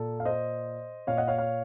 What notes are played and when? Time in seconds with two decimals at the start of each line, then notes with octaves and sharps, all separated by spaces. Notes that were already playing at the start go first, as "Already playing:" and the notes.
Already playing: A#2 A4
0.20 F5
0.25 C5 D#5
1.07 A#2 C#5 F5
1.17 D#5 F#5
1.28 C#5 F5
1.38 C#5 F5